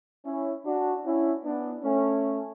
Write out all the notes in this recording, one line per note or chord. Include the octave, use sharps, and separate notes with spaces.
C#4 E4
D4 F#4
C#4 E4
B3 D4
A3 C#4